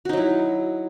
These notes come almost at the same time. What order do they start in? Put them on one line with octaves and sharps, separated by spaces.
F#4 D#4 F#3 E4